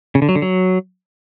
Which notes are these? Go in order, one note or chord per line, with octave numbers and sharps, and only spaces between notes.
C#3
D3
F#3
D3
F#3